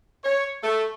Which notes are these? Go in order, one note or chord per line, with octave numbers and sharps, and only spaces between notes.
C#5
A3